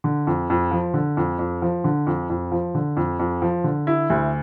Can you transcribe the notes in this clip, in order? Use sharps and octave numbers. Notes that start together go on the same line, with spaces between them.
D3
F2
F2
F3
D3
F2
F2
F3
D3
F2
F2
F3
D3
F2
F2
F3
D3
E4
D2